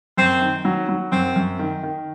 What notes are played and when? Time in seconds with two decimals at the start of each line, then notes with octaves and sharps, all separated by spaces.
0.17 F#2 C4
0.42 D#3
0.65 F#3
0.89 F#3
1.12 F#2 C4
1.36 F#2
1.59 D#3
1.83 D#3